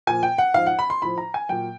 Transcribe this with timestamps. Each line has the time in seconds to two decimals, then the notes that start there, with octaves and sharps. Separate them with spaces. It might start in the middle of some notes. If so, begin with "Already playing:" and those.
0.07 A#2 F3 G#5
0.23 G5
0.38 F#5
0.54 G#2 F3 F5
0.66 F#5
0.79 B5
0.90 C6
1.02 A2 F3 B5
1.18 A#5
1.34 G#5
1.49 A#2 F#3 G5